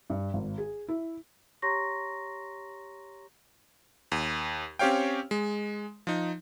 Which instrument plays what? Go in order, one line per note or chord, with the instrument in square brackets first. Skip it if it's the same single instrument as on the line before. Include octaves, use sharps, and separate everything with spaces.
[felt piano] G2
G#1
G#4
E4
[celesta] G4 C#5 A#5 C6 C#6 A#6
[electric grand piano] D#2
C4 C#4 G4 C#5 F5 G5
G#3
F3 D#4